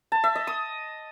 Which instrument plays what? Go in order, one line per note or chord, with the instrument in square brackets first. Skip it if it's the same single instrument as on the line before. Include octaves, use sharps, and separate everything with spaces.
[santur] A5
E5
D#5
D#6